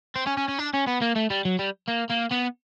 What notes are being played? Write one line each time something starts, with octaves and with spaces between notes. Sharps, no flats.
C4
C#4
C#4
C#4
D4
C#4
B3
A#3
A3
G3
F#3
G3
A#3
A#3
B3